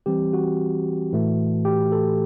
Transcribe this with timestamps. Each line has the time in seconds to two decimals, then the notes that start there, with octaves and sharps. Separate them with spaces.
0.06 E3 G3 C4 G4
0.33 F#4
1.13 A2 E3 A3
1.65 G4
1.92 A4